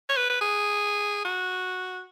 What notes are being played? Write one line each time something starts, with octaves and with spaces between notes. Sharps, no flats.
C#5
B4
B4
G#4
F#4